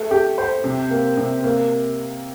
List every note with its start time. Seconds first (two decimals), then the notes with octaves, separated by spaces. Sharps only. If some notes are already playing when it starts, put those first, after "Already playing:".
Already playing: A3
0.11 G4
0.38 C5
0.64 C3
0.91 A#3
1.17 C3
1.44 A#3